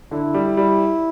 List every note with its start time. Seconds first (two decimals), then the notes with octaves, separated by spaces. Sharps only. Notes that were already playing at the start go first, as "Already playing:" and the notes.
0.11 D3 E4
0.34 G3
0.57 G3